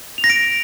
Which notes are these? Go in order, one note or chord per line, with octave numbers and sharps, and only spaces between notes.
F7
A#6
D7